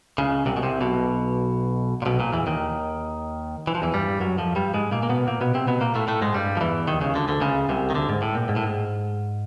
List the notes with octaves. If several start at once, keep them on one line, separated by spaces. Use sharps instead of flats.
C#2 C#3
C2 C3
B2
C2 C3
B1 B2
A#2
B1 B2
A#2
E2 E3
D#2 D#3
E3
F3
E2 E3
G2 G3
F#2 F#3
F2 F3
G2 G3
G#2 G#3
A#2 A#3
A#3
B2 B3
A#2 A#3
B2 B3
C3 C4
B2 B3
A#2 A#3
A2 A3
A2 A3
G#2 G#3
G2 G3
F3
E2 E3
D#2 D#3
C#2 C#3
D2 D3
D2 D3
C#2 C#3
C2 C3
D#3
D2 D3
G#2
A2
A#2
G#2
A2
G#2